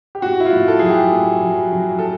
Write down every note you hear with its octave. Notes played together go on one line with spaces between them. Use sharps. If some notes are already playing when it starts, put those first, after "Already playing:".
G4
A2 F#4
E4
F4
A2
A4
F#3 G#4
G4
A2
F#3
F#3
A4